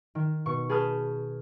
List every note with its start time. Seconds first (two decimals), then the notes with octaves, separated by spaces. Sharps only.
0.15 D#3
0.46 B2 C#6
0.69 G#4 B4 A5 D#6 F6 G6